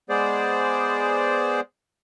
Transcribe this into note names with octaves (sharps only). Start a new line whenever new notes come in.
G#3 B3 G#4 C5 D5